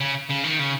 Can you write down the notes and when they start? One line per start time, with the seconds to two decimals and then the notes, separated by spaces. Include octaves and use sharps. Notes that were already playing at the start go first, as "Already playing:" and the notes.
0.01 C#3
0.30 C#3
0.44 D#3
0.60 C#3